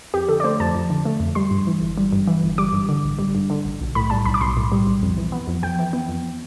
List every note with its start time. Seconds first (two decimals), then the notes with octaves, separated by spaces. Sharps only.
0.14 F2 G4
0.28 D3 A4
0.40 D5
0.44 A3 C5
0.60 F2 A5
0.75 F2
0.90 D3
1.05 A3
1.20 F2
1.35 G3 C6
1.51 G2
1.67 E3
1.81 G1
1.98 G3
2.13 G2
2.28 E3
2.43 G1
2.58 G3 D6
2.73 G2
2.89 D3
3.04 A1
3.19 G3
3.35 G2
3.50 D3
3.65 A1
3.80 B1
3.95 A2 B5
4.10 G3 A5
4.26 B1 B5
4.34 D6
4.41 B1 C6
4.57 A2
4.72 G3
4.87 B1
5.02 F2
5.17 E3
5.32 B3
5.47 F2
5.63 F2 G5
5.79 E3
5.93 B3
6.08 F2